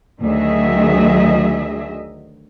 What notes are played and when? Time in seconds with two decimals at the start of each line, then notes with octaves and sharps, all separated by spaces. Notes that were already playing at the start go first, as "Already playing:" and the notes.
0.21 D2 D#3 F#3 G#4 D#5 E5